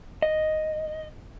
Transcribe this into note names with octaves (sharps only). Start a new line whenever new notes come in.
D#5